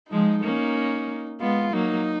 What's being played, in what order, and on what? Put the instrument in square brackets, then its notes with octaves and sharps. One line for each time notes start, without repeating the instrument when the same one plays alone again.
[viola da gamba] F3 G#3 [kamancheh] D#4
[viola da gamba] A#3 C#4
[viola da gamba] G#3 B3 [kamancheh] F4
[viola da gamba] F#3 A#3 [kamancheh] D#4